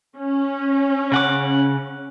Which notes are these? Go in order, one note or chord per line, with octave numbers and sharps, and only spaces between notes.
C#4
C#3 F#5 D6